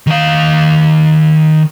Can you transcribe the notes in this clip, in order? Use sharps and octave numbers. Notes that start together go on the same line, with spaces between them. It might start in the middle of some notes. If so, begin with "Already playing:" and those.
D#3 F5